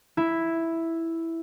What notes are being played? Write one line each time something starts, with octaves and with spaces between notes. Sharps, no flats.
E4